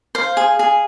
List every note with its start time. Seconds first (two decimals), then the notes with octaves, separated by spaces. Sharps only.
0.15 C5 F5
0.37 G#4
0.59 G#4